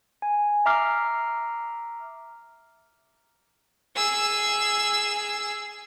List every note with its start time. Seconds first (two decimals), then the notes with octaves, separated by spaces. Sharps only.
0.22 G#5
0.66 E5 A#5 D6 F6 C7
3.96 G#4 E6